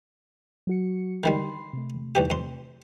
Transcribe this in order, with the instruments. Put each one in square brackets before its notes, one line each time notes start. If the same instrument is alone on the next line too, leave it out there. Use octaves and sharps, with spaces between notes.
[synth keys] F#3 F#4 C#7
[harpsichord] D3 D#3 G3 [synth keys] B5 C6 C7
[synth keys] C3 A3
[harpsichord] B1 E2 G4
F2 C6